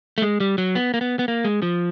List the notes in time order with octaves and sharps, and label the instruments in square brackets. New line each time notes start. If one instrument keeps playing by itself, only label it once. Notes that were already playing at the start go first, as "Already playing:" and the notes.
[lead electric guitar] A3
G#3
G3
F#3
B3
A#3
B3
B3
A#3
G#3
F3